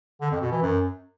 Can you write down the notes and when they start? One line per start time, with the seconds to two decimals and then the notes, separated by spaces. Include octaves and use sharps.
0.21 D3
0.31 F2
0.41 B2
0.52 E3
0.62 F#2